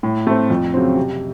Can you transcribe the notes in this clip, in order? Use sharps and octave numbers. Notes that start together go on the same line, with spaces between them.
A2
A3 C4
F2
C#3 F#3 C4
C3